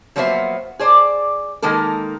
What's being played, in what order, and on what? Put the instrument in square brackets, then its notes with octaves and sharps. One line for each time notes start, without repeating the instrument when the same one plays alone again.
[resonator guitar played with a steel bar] F3 F#3 A#3 B3 C5 E5
G#4 C5 D5
D#3 G#3 A#3 A4 A#4